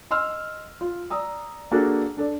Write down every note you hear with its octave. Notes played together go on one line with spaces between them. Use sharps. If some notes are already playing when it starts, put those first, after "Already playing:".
D#5 C6 E6 F6
F4
D5 A#5 D#6 E6
A#3 D4 F#4 G#4 A4
D4 A4 D5